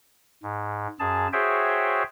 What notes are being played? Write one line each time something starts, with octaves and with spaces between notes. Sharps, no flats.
G#2
F#2 G#4 A5
F#4 G#4 C5 C#5 E5 G5